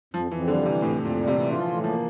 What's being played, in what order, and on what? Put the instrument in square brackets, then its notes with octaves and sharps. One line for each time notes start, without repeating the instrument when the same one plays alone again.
[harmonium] F2 [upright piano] F3
[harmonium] F2 [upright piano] E3
[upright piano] D3 [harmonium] G3
[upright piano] C3 [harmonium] E3
[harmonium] F2 [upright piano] A2
[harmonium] F2
[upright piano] A#2
[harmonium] G3
[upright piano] C3
[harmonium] E3
[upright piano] D3 [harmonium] F4
[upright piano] F3
[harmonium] A2 [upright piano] E3
[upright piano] F3 [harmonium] A#3